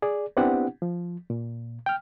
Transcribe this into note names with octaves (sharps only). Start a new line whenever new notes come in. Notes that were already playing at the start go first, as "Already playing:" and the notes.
G#4 D5
B3 C4 D4 E4 G4 F#5
F3
A#2
G5 F6